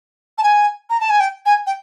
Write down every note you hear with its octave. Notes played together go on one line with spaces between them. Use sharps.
A5
G#5
A#5
A5
G#5
G5
G#5
G5